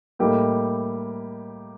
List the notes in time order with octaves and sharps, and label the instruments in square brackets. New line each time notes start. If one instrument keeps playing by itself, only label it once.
[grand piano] A2 G3 A#3 D#4 G4